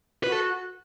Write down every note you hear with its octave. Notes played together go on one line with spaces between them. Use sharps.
F#4 B4
A4